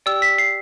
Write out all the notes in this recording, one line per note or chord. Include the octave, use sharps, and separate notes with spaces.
G4 D5 G5 E6
B6
C7